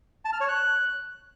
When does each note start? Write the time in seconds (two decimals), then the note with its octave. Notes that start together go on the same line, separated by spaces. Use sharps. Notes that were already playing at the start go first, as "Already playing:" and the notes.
0.25 A5
0.33 F6
0.41 C#5
0.48 F#6